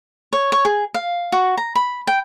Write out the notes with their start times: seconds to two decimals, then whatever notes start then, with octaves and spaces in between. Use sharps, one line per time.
0.33 C#5
0.52 C#5
0.65 G#4
0.94 F5
1.32 F#4
1.57 A#5
1.75 B5
2.07 G5